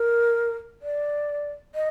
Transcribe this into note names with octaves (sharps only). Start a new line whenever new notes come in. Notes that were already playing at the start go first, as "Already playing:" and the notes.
Already playing: A#4
D5
D#5